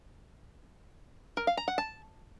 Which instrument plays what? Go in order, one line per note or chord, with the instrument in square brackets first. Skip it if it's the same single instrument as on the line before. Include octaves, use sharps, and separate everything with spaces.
[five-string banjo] A#4
F5
A#5
F#5
A5